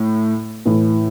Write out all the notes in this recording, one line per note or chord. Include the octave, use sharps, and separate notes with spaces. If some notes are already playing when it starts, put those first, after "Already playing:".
Already playing: A2
A2 E3